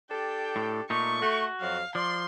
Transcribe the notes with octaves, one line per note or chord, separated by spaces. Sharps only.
D4 G4 A4 G5
A2
A#2 A3 D#4 C#6
A3 F#4
F2 F#3 F5
F3 D5 C6